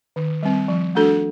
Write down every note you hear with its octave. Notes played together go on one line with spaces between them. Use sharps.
D#3
G3 C4
F3
A3 D4 F#4 A4